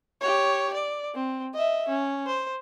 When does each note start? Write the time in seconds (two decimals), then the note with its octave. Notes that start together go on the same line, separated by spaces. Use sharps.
0.21 G4 C#5
0.74 D5
1.14 C4
1.54 D#5 E5
1.88 C#4
2.26 C5